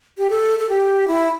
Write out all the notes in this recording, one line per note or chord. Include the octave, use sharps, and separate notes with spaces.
G4
A4
A4
G4
E4